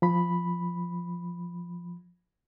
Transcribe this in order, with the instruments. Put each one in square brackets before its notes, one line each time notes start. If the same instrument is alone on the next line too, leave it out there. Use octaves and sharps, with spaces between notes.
[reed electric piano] F3 B5